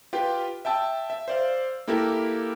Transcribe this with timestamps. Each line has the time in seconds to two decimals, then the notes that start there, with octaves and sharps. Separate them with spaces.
0.13 F4 G4 B4 G5
0.65 E5 G5 A5 E6
1.10 E5
1.28 C5 D5 F5
1.88 A#3 E4 G4 A4 A#4